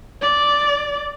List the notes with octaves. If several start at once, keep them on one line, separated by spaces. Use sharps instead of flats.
D5